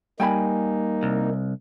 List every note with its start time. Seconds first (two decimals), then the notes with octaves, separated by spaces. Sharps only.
0.20 G3 A#3 D#4 G5 G#5 B5
1.03 C2